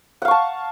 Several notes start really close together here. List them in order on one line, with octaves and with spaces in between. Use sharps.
F#5 F5 C#6 A5